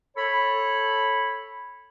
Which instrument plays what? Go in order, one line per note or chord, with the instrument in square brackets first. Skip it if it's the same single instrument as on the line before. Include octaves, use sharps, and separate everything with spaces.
[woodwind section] A4 C#5 B5